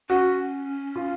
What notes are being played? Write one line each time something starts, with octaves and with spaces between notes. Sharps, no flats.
C#4 F#4
F4